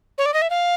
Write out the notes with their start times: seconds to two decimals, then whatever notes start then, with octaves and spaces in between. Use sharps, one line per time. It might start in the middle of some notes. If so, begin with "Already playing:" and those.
0.18 C#5
0.26 D5
0.34 D#5
0.42 E5
0.50 F5